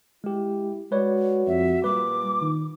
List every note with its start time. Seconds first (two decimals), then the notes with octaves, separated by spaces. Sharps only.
0.24 G#3 E4 G4
0.92 G#3 F#4 B4 C#5 D5
1.47 F2 E5
1.84 A#2 G3 B4 D6
2.42 D#3